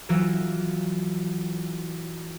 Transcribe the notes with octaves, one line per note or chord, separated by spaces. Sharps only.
E3 F#3 E4 F4